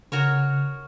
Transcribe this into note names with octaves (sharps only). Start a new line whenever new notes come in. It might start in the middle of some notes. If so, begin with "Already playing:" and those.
C#3 F#4 A#4 C#5